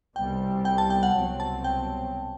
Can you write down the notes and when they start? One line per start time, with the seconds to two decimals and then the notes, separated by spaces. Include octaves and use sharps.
0.16 C2 B2 G3 C4 G5
0.65 G5
0.78 A5
0.90 G5
1.03 F#5
1.16 C2 B2 F#3 C4
1.40 A5
1.64 G5